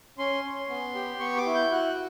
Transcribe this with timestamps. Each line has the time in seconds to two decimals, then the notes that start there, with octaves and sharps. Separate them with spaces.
0.18 C#4 C6
0.44 C#4
0.69 B3
0.95 G4
1.20 B3 C#6
1.37 D6
1.46 E4
1.54 G6
1.72 F#4 F#6